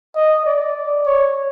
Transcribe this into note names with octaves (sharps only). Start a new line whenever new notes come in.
D#5
D5
C#5